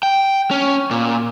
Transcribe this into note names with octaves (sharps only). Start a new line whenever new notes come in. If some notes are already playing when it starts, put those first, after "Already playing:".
G5
C#4
A#2